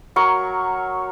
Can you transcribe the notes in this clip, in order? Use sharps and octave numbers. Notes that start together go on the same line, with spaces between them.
F#3 A#4 C#6